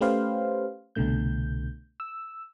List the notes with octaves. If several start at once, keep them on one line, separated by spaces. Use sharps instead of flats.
A3 C#4 G4 B4 C5 F5
C2 B2 D3 A3 G6
E6